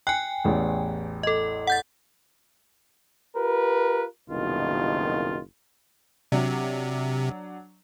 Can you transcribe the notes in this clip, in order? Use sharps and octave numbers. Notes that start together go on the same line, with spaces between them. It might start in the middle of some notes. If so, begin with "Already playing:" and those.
G5 G#5 F#6
A1 E2
A4 D#5
F#5 G6 A6
F4 G4 A#4 B4
F#1 C2 B2 D#3 F4
C3 F#3 D4